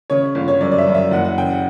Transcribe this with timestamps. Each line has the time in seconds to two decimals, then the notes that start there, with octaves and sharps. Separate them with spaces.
0.10 C#3 C#5
0.35 G1
0.48 C#5
0.61 F#2 D5
0.72 D5
0.78 E5
0.87 F#2
0.94 E5
1.11 F#1 F#5
1.25 F#5
1.37 C#3 G5
1.50 F#5